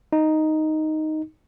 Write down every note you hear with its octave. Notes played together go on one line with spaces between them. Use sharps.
D#4